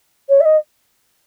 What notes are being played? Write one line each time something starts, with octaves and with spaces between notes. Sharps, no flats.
C#5
E5
D#5